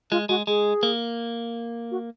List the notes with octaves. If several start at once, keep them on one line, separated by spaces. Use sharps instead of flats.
G#3 F4
G#3 F#4
G#3 G#4
A#3
F#4